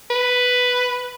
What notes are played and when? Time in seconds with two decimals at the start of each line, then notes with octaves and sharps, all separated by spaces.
0.10 B4